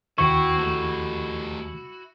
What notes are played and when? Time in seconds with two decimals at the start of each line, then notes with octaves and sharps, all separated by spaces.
0.18 D#2 E4 F#4 C5 G5 C#6
0.58 A3 G4